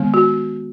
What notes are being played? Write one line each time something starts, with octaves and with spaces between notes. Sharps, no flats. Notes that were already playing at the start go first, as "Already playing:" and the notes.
Already playing: D#3 G#3 B3
F#4